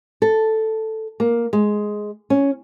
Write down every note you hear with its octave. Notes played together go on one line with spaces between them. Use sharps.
A4
A#3
G#3
C#4